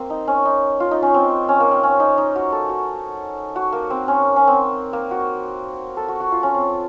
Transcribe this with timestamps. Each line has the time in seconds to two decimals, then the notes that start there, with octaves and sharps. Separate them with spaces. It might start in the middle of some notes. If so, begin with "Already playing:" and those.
Already playing: A#3 C4
0.10 D#4
0.28 C#4
0.45 D#4
0.80 F4
0.91 D#4
1.02 C#4
1.14 C4
1.49 C#4
1.60 A#3
1.71 C4
1.83 C#4
2.00 D#4
2.18 D#4
2.36 F#4
2.52 A4
2.69 F#4
3.56 F#4
3.73 A#3
3.90 C4
4.08 C#4
4.36 C#4
4.47 C4
4.93 A#3
5.11 F#4
5.97 A4
6.08 F#4
6.20 F#4
6.32 F4
6.43 C#4
6.55 C4